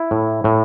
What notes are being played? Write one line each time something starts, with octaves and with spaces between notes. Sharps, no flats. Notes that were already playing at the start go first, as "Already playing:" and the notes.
Already playing: E4
A2
A2